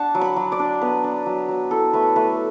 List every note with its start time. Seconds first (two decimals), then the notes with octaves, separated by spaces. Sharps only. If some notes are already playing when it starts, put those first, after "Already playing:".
Already playing: D4 F#5 A5
0.15 F#3
0.21 B5
0.36 F#3
0.52 D5
0.59 D4
0.81 B3 B4
1.04 D4
1.26 F#3
1.48 F#3
1.71 E4 A4
1.93 A3 B4
2.16 A3 B4